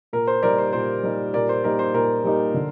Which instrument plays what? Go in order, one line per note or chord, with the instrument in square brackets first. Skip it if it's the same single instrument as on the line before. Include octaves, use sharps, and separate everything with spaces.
[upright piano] A#2 [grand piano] A#4
[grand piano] C5
[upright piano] G3 A#3 D#4 G4 [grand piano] A#4 D5
[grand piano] C5
[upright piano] A#2 [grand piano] C5
[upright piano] G3 A#3 D#4 G4
[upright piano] A#2 [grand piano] A#4 D5
[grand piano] C5
[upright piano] G3 A#3 D#4 G4 [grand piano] A#4
[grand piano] C5
[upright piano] A#2 [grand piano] A#4
[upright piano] G3 A#3 D#4 G4
D3